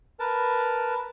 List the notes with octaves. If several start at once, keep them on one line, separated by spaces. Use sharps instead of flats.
A#4 B4 A5